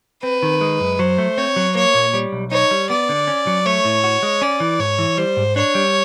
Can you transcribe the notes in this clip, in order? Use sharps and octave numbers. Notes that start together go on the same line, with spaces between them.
C4 B4
D#3
G#3
F#2
F#3 C5
A3
C4 C#5
F#3
A#3 C#5
A#2
G3
B1
D#4 C#5
G3
B3 D5
D3
C#4
F#3
A3 C#5
A2
F#4
G#3
C#4 D5
E3
G#2 C#5
E3
G3 C5
G#2
D4 C#5
G3